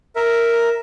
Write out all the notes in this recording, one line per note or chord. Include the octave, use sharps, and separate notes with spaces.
A#4 E5